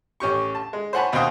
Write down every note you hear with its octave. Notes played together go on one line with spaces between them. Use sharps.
A1 C#4 G4 C#6
A5
G#3
C5 C#5 F#5 G#5 A5 B5
D#2 B2 C4 F5 G5 D#6